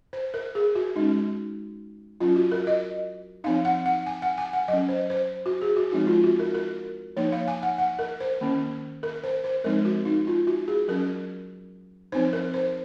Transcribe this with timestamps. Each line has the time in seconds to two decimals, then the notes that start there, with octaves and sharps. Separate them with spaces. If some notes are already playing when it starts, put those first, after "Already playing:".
0.13 C5
0.34 A#4
0.55 G#4
0.75 F#4
0.96 G#3 C#4 D#4
2.20 F#3 C#4 F4
2.36 F#4
2.52 A#4
2.67 D#5
3.44 F3 C4 D#4 F5
3.65 F#5
3.86 F#5
4.06 G#5
4.22 F#5
4.38 G#5
4.53 F#5
4.68 F#3 C#4 D#5
4.89 C5
5.10 C5
5.46 F#4
5.62 G#4
5.76 F#4
5.92 F3 G#3 C4 D#4 F#4
6.07 F4
6.24 F#4
6.39 A#4
6.54 A#4
7.17 F3 A#3 D#4 C#5
7.32 F5
7.48 G#5
7.63 F#5
7.78 F#5
7.99 A#4
8.20 C5
8.41 D#3 A#3 C#4
9.03 A#4
9.24 C5
9.44 C5
9.64 F3 G#3 C4 D#4 A#4
9.85 F#4
10.05 D#4
10.27 F4
10.47 F#4
10.68 G#4
10.88 F#3 C#4 A#4
12.12 F3 C4 D#4 C5
12.33 A#4
12.54 C5